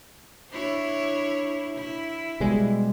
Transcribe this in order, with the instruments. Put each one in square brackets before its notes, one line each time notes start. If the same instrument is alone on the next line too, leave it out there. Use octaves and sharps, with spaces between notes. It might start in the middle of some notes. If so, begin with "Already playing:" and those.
[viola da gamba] D4 E4 C#5
E4
[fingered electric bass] B2 G3 G#3